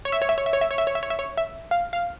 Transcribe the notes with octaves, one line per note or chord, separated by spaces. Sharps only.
C#5
E5
C#5
E5
C#5
E5
C#5
E5
C#5
E5
C#5
E5
C#5
E5
C#5
E5
F5
F5